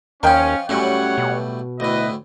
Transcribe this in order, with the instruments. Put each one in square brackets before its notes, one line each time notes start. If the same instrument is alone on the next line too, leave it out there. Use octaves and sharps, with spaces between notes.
[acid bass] D#2 [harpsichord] F3 F4 [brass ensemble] C#4 [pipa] A#4 D#5 G5
[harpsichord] A2 F#3 G3 [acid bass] C#4 [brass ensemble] G4 C#5 F#5
[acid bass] B2
[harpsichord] D2 A2 [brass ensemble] E4 B4 D#5